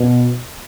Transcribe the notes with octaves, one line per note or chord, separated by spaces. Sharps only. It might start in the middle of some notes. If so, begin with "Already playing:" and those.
Already playing: B2